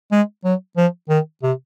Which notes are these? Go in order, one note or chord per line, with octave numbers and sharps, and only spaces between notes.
G#3
F#3
F3
D#3
C3